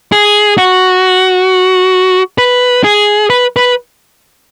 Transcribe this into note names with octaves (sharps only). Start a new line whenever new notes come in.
G#4
F#4
B4
G#4
B4
B4